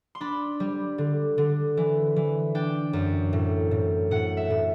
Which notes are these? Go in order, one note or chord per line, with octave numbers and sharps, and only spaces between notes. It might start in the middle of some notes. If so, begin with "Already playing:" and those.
C6
D4 B5
G3
D3
D3
E3
E3
D4 G5
F#2
A2
A2
A2 F#5
E5
A2